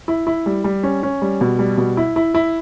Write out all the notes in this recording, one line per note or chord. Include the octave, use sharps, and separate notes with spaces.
E4
E4
G3
G3
C#4
C#4
G3
B2
G3
B2
E4
E4
E4